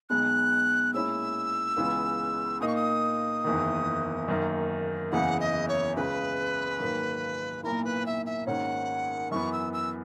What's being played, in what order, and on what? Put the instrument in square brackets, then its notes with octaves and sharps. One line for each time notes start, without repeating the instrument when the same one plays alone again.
[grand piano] B1 B2 G#3 B3 [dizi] F#6
[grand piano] A#2 G#3 C#4 E4 [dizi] E6
[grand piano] C#2 C#3 E3 G#3 B3
[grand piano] A#2 A#3 D#4 [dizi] D#6
[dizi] C#6
D#6
[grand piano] F#1 E2 D#3
F#2 D#3 A#3
[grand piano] F#1 E2 C#3 E3 [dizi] F#5
[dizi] D#5
C#5
[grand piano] C#2 C#3 G#3 [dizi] B4
[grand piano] G#2 D#3 F#3 A#3
[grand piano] B1 A#2 A#3 E4 [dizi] A#4
[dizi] B4
E5
E5
[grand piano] G#1 G#2 D#3 A#3 C#4 [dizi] F#5
[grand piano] F#2 E3 B3 [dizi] C#6
[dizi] E6
E6